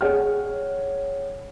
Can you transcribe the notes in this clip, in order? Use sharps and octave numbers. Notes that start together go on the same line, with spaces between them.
G#4 C#5 F#5 G5 F6